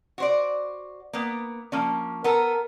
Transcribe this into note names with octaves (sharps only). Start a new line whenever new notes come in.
F#4 C5 D5
A#3 B3
F3 A#3 C#4
B3 A4 A#4 A5